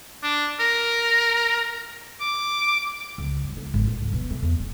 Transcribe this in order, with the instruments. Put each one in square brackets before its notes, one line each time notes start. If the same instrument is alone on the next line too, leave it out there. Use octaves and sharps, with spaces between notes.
[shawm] D4
A#4
D6
[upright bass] C#2
G2
C#2
G#1
A#2
D2
B2
A3
E2
D#1